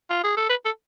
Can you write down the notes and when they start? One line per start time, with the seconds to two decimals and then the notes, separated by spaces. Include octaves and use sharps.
0.10 F4
0.24 G#4
0.37 A4
0.49 B4
0.65 A4